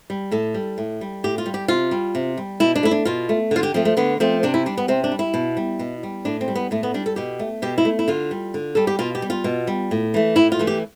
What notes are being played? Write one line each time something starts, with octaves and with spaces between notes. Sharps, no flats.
G3
A2 A4
G3
A2
G3
A2 G4
F4
G3
G4
C3 F4
G3
C3
G3
B2 E4
D4
A3 E4
D4
B2 F4
A3
D3 F4
G4
F3 A3 C4
A3
D3 B3
F3 A3 C4
C3 D4
E4
G3 D4
B3
C3 C4
D4
G3
E4
B2
G3
B2
G3
A2 D4
C4
G3
B3
A2 A3
B3
G3 D4
A4
B2 G4
A3
B2 G4
E4
A3
E4
D3 F4
G3
D3
G3 A4
G4
B2 F4
G4
G3
F4
B2
G3
A2
E3 A3
A2 E4
F4
E3 A3
G4